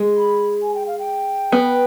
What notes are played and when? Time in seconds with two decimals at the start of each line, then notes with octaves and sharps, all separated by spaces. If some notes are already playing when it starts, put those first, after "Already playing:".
Already playing: G#3
0.17 B5
0.62 G#5
0.74 G5
0.87 F5
0.99 G5
1.52 B3